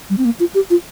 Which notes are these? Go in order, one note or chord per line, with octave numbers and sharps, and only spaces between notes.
G3
C4
A#3
F4
G4
F4